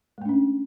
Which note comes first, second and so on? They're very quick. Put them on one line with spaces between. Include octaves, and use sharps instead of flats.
G#3 A3 D4 C#4